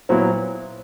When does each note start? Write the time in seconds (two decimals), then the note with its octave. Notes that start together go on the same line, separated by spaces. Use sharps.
0.09 A#2 F#3 B3 E4 C5